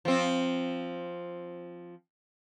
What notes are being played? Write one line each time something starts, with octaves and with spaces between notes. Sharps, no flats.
F3 C4